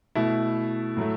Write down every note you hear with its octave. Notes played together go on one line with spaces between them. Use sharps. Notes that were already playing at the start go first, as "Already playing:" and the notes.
B2 A3 E4
A2 F#3 A3